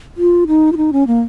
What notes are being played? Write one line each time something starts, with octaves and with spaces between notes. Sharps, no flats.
F4
D#4
F4
D#4
C#4
A#3